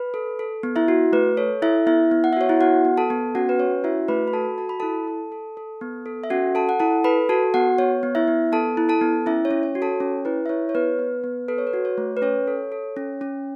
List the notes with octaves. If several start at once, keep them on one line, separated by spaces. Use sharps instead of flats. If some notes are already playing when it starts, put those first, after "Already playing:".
Already playing: B4 B5
A4
A4
B3
E4 E5
F#4
A3 B4
A4 C#5
E4 A4 E5
B3 E4 E5
B3
F#5
E5
F#4 C#5
E4 E5
B3 F#4 F#5
B3
A4 A5
B3
C#4 F#4 F#5
B4
C#4 C#5
E4 F#4 E5
A3 B4 B5
B5
F#4 A4 A5
F#4 A5
B5
E4 A4 A5
A4
A4
A4
B3
A4
E5
C#4 F#4 F#5
A4 A5
F#5
E4 A4 A5
A4 B4 B5
F#4 A4 A5
B3 F#4 F#5
B3 C#5
B3
E4 E5
B3
B3 A4 A5
E4
A4 A5
B3
C#4 E4 E5
C#5
C#4
C#5
F#4
A4 A5
C#4 C#5
E4 B4
E5
E4 C#5
C#5
B3 B4
B3
B3
A4 B4
C#5
B4
F#4
C#5
A3
B4
C#4 C#5
A4
A4
C#4
C#4